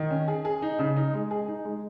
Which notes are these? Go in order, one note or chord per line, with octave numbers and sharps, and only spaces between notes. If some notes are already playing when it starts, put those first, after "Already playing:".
Already playing: D#3
C#4
G#4
G#4
D#4
C#3
D#4
G#3
G#4
D#4
G#3